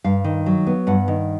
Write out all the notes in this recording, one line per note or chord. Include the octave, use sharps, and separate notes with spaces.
G2 F5
D#3
F#3
B3
G2 F#5
D#3